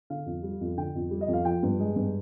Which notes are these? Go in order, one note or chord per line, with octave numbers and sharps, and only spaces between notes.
D3 F5
F2
G3
F2
D3 G5
F2
G3
D#5
F2
F5
F3 G5
G2
G#3
G2